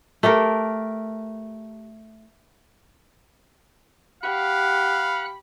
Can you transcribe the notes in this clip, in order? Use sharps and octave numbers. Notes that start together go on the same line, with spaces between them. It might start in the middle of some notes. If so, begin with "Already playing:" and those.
A3 G4 A4 A#4
G4 F5 F#5 B5 F#6